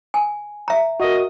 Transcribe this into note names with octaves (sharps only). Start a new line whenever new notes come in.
G#5
E5 A#5
F#4 A#4 D#5